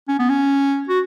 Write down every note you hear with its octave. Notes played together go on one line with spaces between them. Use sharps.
C#4
B3
C#4
F#4